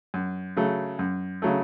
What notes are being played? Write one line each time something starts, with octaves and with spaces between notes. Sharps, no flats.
F#2
C#3 F#3 A3
F#2
C#3 F#3 A3